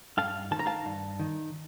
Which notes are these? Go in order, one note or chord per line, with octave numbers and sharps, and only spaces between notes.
G2 F5 A5
D#3 A5
A#5
F5 A5
G2
D#3